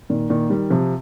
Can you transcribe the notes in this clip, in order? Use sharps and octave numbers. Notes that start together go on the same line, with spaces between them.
A#2 D#3
A#2 D#3
D#3 G3
C3 F3